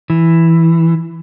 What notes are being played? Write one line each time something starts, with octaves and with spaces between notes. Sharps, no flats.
E3